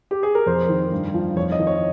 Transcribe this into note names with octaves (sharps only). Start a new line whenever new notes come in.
G4
G#4
A#4
F2 C5
D#3
G2
F3
F2 C#5
D#5
D#3
C#5